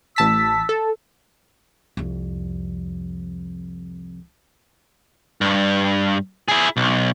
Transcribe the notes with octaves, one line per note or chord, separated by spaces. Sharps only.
A1 A5 E6 B6
A4
C2 F2
G2
E4 G#4
B1